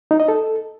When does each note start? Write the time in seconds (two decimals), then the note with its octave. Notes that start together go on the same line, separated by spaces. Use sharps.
0.11 D#4
0.20 D#5
0.28 A4